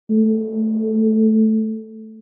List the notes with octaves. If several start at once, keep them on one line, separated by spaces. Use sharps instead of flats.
A3